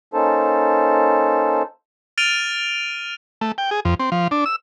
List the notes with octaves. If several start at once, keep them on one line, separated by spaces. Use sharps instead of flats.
A#3 C#4 D#4 A4 C5 A5
F6 A6 D7 D#7 F7 G7
A3
G5
G#4
F2
C4
F3
D4
E6